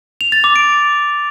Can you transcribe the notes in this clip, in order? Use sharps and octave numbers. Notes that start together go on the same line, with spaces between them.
F7
A6
D6
D7